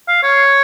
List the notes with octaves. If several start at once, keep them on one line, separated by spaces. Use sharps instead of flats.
F5
C#5